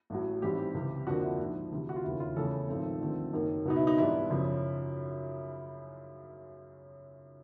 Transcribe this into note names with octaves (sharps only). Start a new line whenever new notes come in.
A1 A2 F#3
A1 G#2 E3 G3 C4 G4
C#2 C3 E3 G3
F2 D3 F3 A#3 D4 F#4
E4
A#1 G#2 F3
D2 C3 E3
F#4
F4
E1 D#2 C#3 E4
F4
E2 C#3 E3 A3 C#4 A4
G#1 G#2 F3 A3 C4
D#2 D3 F3 A3 C4
F#1 F#2 D#3 F#3 A#3
C#2 B2 F#3 B3 D#4
E4
D#4
G#2 E3 G3 B3 D4 E4
F#2 C#3 F3